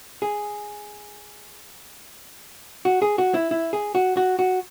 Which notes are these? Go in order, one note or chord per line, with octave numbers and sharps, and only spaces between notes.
G#4
F#4
G#4
F#4
E4
E4
G#4
F#4
F#4
F#4